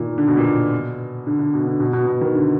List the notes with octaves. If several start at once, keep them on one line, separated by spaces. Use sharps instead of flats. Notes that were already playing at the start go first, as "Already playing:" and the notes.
Already playing: A#2 D#3
D3
B2
A#2
B2
D3
D3
B2
D3
B2
B2
B2
D#3
D3